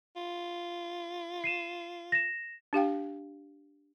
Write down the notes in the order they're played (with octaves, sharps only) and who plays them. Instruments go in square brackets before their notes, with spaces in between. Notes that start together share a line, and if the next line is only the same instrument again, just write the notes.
[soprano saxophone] F4
[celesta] C7 D#7 E7
A#6 E7
[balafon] D4 G4 F5 G5